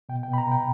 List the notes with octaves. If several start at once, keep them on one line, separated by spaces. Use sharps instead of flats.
B2 G5
G5
B2 B5
A#5
B2 G5